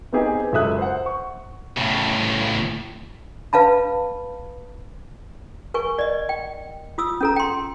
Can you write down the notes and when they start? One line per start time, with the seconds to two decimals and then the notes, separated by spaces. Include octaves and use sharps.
0.13 B3 C4 D#4 G4 G#4
0.52 C#2 F#2 A4 E5 D#6 F#6
0.78 C5 F#5
1.06 C#6
1.78 A2 C#3
3.53 B4 F5 A5 B5
5.74 A#4 G#5 C#6
5.99 D5 D#5
6.29 G5
6.98 F4 D#6 E6
7.21 C#4 A4 A#5
7.36 G5 C6